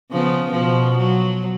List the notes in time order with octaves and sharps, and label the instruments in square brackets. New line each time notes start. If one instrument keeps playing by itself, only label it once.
[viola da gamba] C#3 F3 B3
B2 F3
F#3